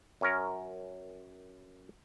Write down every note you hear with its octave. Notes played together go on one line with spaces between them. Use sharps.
F#2 C#4 A#4